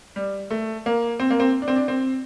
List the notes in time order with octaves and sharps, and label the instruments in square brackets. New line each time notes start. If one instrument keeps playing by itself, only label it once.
[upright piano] G3
A3
A#3
C4
A#3
C4
D4
C4
D4
C4